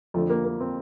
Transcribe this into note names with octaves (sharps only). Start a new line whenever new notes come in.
F2 D3 F3 A3
A#3
A#3
C4